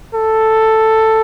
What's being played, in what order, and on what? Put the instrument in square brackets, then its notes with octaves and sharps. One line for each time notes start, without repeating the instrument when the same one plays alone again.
[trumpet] A4